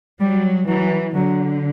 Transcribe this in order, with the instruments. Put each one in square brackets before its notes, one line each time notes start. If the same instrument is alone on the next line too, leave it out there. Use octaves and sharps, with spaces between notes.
[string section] F#3 [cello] G3
[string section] E3 [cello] F#3
[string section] D3 [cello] F#3